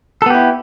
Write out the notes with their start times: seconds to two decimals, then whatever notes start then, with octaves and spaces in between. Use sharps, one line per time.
0.22 A4
0.26 B3
0.30 G4
0.35 E4